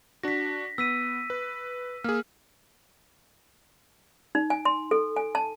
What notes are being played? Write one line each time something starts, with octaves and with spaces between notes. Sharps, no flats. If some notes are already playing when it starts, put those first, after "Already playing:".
D4 F#4 A#6 B6
B3 E6 B6 D#7
B4
A#3 G#4 F6
D#4
G#5
C6
A4
G#5
A5